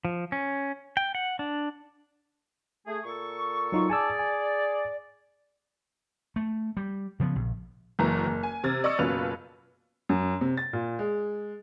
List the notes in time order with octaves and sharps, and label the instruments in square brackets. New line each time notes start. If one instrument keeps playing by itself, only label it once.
[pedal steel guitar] F3
C#4
G5
F#5
D4
[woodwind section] A3 G#4
A#2 A4 C#6
[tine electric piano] F#3 D#4 F4
[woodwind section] G#4 D5 [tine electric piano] G#5 A5 E6
[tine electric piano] G#5
[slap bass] A3
G3
C#3 F3 G#3 B3
A#1
[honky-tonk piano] F#1 F#2 E3 A#5
F#1
G#5
C3 F6 G#6 A6
D5 D#5 C#6 E6 C#7
F#1 B2 C#4 F4 B4 F7
[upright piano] F#2
C3
A6
A#2
G#3